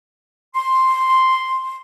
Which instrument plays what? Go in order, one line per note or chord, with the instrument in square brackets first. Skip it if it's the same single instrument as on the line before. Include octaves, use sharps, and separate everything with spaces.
[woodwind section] C6